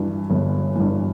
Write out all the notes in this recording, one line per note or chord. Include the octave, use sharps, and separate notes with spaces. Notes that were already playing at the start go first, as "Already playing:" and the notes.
Already playing: G2 E3
G1
G2 E3